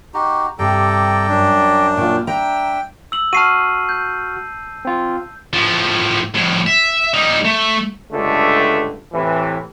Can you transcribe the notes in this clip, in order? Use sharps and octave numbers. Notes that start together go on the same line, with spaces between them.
D#4 F#4 G4
G2 C3 A4 D5 G5 A#5
F#2 D4
A#2 A3 F4 G5
D4 E5 G5 A#5
E6 F#7
F#4 A5 F6 C7 D#7
G6
C4 F4
A2 F3
F2 A2
E5
G3 D#4
A3
C#2 G2 D3 A3 A4
A2 C3 E3